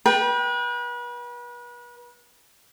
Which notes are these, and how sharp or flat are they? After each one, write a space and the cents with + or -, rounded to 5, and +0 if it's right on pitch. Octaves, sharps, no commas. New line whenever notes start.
B4 -35 G5 +0